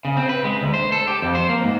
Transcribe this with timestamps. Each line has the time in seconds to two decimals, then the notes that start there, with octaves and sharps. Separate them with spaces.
0.05 C#3
0.17 C4
0.29 B4
0.44 G#3
0.61 D2
0.74 C5
0.92 A4
1.07 G4
1.22 F2
1.35 C5
1.49 A#3
1.63 G#2